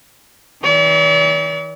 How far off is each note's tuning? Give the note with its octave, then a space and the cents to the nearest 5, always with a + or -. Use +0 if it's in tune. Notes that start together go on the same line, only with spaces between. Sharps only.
E3 -45 D5 -45